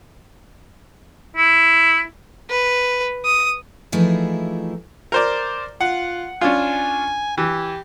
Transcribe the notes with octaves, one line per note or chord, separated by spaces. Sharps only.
E4
B4
D#6
E3 F3 A3 D#4 E4 G#4
A#4 C5 D5
F4 F#5
C#4 D4 F4 G#5
E3 G4